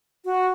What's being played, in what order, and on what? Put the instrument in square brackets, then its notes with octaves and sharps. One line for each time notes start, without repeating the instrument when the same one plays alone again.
[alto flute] F#4